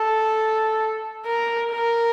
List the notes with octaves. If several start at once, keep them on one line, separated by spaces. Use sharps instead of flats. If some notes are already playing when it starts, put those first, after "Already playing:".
Already playing: A4
A#4
A#4